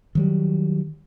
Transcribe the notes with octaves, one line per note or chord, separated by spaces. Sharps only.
D#3 F#3 G3